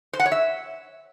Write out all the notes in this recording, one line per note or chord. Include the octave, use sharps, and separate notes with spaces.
C5
F#5
C#5
E5